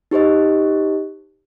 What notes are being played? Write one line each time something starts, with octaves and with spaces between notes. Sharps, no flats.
D#4 G4 C5 D#5